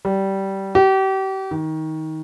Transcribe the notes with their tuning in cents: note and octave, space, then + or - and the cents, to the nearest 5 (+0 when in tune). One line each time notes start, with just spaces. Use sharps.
G3 -15
G4 -35
D#3 +20